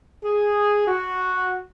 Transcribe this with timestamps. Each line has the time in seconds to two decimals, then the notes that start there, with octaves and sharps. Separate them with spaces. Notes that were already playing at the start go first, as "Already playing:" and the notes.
0.24 G#4
0.88 F#4